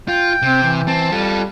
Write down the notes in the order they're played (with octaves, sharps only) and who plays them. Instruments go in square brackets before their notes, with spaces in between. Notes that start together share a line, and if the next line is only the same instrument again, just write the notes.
[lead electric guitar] F4 [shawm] G5
[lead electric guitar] C3 [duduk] C4
[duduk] E3
[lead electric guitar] C4 [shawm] A5
[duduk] G3 [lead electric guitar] F4 A4